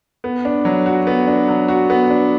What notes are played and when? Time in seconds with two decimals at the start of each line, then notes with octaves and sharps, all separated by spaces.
0.24 B3
0.45 D4
0.65 F#3
0.86 F#4
1.07 B3
1.27 D4
1.48 F#3
1.68 F#4
1.90 B3
2.10 D4